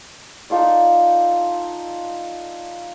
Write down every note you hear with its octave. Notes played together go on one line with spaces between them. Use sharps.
D#4 F4 A4 D5